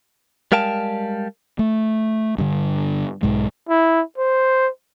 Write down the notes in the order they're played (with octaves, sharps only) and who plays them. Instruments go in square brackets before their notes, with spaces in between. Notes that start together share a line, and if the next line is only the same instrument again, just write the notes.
[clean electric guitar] G3 G#3 A#4 F5 G5 A5
[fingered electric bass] A3
G2 D3
B1 G#2 G#3
[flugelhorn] E4
C5